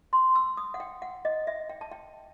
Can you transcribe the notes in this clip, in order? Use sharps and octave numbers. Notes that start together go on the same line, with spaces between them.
C6
E6
D#6
F#5
G5
F#5
D#5
E5
G5
A5
G5